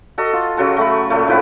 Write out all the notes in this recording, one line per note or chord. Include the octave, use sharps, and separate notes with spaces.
F#4 A4 D#5
F4
C#3 F#3 F#4 A4
F#3 A3 E5 B5
A#2 A3
A2 D#3 F3 B4